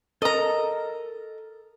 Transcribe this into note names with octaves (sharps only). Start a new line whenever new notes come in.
A4 A#4 D#5 A#5